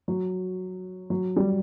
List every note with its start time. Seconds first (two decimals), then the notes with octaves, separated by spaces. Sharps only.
0.08 F#3
1.10 F#3
1.36 G3